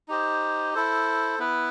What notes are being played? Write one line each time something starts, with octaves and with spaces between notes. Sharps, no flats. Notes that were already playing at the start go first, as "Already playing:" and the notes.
D#4 G4 C5 D#5
E4 A4 C5
B3 E4 B4